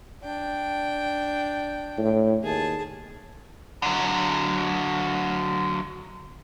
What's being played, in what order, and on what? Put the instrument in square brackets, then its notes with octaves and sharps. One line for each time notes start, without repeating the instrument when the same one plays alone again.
[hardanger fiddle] D4 G5
[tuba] A2
[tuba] D#2 [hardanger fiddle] G#4 A5
[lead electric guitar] D3 F#3